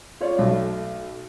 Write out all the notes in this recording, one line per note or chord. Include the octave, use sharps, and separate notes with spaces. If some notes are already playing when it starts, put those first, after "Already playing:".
F4 C#5 D5
B1 A3